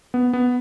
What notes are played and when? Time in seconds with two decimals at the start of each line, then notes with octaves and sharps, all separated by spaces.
0.14 B3
0.33 B3